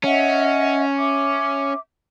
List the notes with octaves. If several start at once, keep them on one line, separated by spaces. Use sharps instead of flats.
C#4 D#5 E5 F#5
E5 D6